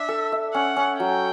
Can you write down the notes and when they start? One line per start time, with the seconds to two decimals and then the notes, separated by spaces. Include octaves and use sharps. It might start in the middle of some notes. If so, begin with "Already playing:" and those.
Already playing: D4 E5
0.09 A4
0.32 E5
0.54 C#4 F#5
0.77 C#4
1.00 F#3 G5